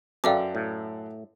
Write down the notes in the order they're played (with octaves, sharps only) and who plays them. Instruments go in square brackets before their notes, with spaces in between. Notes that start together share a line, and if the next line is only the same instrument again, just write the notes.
[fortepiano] F#2 A4 [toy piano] B4 F5 G5 [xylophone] D5 E5 D6
[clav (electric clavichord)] A2